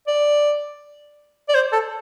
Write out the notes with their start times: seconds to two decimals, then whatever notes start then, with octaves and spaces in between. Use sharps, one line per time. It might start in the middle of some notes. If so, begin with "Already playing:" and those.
0.08 D5
1.49 D5
1.55 C5
1.73 A4